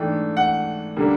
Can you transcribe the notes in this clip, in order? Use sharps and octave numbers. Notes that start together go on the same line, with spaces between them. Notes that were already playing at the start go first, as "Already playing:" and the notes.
Already playing: G#2 E3 A3 D4 G5
F#5
D3 G3 A#3